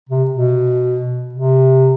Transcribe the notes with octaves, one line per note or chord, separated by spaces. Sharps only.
C3
B2
C3